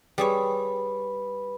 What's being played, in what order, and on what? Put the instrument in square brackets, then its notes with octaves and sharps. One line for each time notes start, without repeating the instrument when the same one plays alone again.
[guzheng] G3 G#4 C#5 [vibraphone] B4 B5